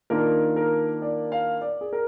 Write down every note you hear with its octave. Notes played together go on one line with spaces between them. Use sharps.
D#3 A#3 D4 F4 A#4
A#4
D5
F5
D5
G#4
A#4